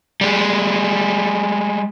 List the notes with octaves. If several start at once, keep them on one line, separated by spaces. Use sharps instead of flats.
G3 G#3